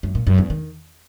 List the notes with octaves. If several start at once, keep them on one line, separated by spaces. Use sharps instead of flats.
F#2
A#2
F#2
E2
D#3